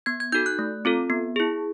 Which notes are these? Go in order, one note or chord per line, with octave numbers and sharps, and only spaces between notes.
B3 G#6
G#6
D#4 F#4 A4 G6
F#6
A3
C4 F4 A4
B3
E4 G#4